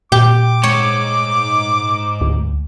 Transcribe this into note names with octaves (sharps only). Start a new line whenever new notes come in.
A#2 G4 D6
G#2 C#5
D2